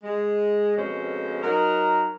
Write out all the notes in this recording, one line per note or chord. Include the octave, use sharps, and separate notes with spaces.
G#3
F2 B2 G#3 C#4 C5
F#3 D#4 A#4